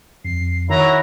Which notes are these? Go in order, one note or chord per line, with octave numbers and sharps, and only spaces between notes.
F2 C7
D#3 F#3 E4 A#5